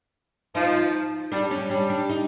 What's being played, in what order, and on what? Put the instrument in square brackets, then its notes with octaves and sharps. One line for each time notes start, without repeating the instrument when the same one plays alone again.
[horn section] F3 [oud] D#4
[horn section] G3 [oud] D4
[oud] C#4
[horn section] G3 [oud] D4
[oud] D4
D#4